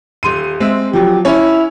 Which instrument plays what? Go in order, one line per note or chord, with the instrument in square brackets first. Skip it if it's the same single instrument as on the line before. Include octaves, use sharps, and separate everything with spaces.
[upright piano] D#1 C6 D#7
G#3 C4 E5
[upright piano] F3 F#3 [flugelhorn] G4
[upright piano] C#4 C#5 [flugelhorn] E4